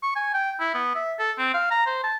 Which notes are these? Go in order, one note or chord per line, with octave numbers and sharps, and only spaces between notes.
C#6
G#5
G5
E4
B3
E5
A4
C4
F5
A#5
C5
A5